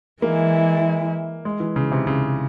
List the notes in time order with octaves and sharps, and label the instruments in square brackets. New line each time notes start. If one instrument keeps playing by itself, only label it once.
[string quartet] E3 G#3 E4 [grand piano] A#3
[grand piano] G#3
E3
C#3
C3
C#3